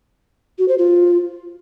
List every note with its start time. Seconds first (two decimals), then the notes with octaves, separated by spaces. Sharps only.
0.59 F#4
0.68 C5
0.78 F4